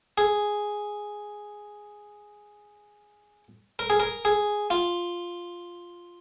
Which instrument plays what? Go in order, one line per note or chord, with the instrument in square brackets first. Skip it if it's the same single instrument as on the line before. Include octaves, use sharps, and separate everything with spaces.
[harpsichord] G#4
A#4
G#4
A#4
G#4
F4